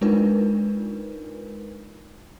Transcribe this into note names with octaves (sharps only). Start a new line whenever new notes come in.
G#3 D4 D#4 F4 A#4 B4